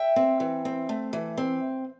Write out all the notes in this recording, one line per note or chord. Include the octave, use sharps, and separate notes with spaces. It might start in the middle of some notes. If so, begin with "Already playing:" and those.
Already playing: E5 G5
C4
E3
C4
A3
E3
C4